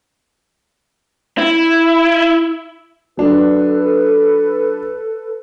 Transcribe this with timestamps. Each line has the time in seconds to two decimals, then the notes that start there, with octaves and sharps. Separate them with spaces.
1.38 E4
3.17 F#3 D4 A4 B4